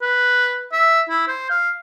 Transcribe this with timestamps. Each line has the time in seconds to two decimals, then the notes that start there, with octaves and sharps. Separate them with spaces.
0.02 B4
0.72 E5
1.09 E4
1.28 C5
1.50 F5